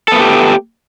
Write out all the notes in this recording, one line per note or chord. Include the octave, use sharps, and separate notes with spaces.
A3 B3 G4 A4